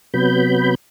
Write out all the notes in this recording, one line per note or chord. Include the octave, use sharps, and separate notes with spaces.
C3 F#3 B3 B5 G6